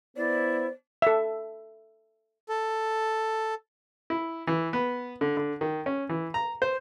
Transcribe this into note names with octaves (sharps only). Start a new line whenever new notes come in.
B3 E4 C5 D5
A4 E5
A4
E4
E3
B3
D3
D3
D#3
C#4
E3
A#5
C5